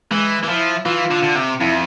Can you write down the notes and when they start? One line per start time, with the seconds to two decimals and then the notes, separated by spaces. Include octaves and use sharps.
0.11 E3 G#3
0.44 E3
0.49 F3 E4
0.85 E3 F4
1.11 D3
1.23 D3
1.35 C3
1.61 F2 E4